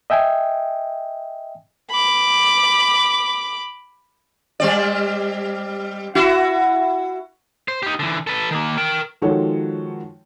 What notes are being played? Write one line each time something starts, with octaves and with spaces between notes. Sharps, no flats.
D#5 E5 G5 G#5
B5 D6
G3 C4 D5
E4 F#4
C5
D#4 G4
D3 E3
A4 B4
D#3 A#3
A#4 G5
D#3 F3 G#3 F#4 A4 C#5